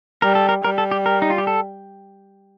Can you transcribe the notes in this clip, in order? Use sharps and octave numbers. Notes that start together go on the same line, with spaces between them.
G3 A#4
A4
A#4
G3 A#4
A4
G4
A#4
D#4
F4
G4
A4